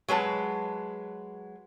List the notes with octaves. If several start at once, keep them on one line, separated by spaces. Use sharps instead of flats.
F#3 G#3 B4 A5